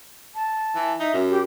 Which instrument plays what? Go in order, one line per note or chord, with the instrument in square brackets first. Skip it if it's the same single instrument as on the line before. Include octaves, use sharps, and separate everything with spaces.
[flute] A5
[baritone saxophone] E3
[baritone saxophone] D#4 [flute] E5
[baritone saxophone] F#2
[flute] G4